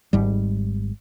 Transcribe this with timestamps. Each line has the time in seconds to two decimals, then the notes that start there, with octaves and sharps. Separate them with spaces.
0.13 G#1 G#2 G3